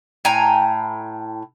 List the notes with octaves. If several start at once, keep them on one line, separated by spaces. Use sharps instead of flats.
A2 G5 G#5 A#5